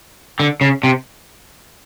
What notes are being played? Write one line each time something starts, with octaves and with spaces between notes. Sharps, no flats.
D3
C#3
C3